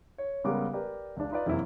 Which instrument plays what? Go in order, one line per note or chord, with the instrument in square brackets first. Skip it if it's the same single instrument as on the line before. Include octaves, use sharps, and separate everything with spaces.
[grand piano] C#5
C#3 G3 G#3 B3 A#4 D6
G4 A#4 B4 D5
C#2 D4
D#4 F4 B4 D5
F#2 C3 E3 A#3 E4